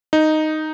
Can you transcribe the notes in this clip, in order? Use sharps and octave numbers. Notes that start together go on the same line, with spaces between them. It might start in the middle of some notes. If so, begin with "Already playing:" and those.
D#4